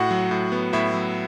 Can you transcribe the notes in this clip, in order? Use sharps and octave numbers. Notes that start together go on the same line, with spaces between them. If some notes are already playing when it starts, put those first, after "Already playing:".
Already playing: A2 F#4 F#5
F#3
A2
B3
A2 E4 E5
F#3